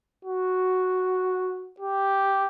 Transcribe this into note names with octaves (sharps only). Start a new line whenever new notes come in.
F#4
G4